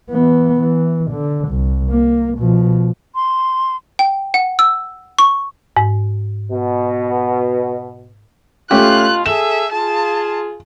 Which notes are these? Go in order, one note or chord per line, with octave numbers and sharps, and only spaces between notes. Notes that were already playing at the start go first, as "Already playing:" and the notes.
E3 B3
E3
D3
C2
A#3
B2 F3
C6
G5
F#5
E6
C#6
G#2
B2
B2 A3 C#4 F4 G4 F#6
G#4 A4 E5 E7
F4 G#4 A5